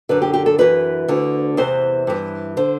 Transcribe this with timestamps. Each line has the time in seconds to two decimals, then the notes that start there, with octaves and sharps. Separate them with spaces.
0.09 F#2 D3 B4
0.22 G4
0.33 G4
0.46 A4
0.58 F#2 E3 B4
1.08 D2 D3
1.57 E2 C3 E3 C5
2.07 G2 E3
2.57 D3 C5